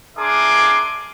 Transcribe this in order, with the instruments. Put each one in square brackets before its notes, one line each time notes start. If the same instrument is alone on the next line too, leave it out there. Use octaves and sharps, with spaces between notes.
[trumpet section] D4 G#4 A#4 E5 C6 D6